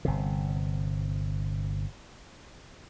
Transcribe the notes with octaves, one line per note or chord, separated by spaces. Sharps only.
G1 C3